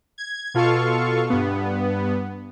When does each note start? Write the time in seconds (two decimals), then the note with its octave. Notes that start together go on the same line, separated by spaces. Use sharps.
0.18 G#6
0.54 B2 F4 A4 F5 C#6
1.30 G2 B3